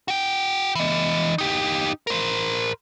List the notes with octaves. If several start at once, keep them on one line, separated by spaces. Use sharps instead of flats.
F#4 G5
E3 D#5
D#4 G4
A#4 C5